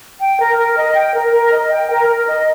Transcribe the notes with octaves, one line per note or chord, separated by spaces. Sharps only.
G5
A#4
A#4
D#5
G5
A#4
A#4
D#5
G5
A#4
A#4
D#5